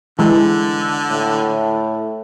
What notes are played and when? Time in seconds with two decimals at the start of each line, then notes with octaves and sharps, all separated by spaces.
0.19 D3 E3 G#3
1.11 A2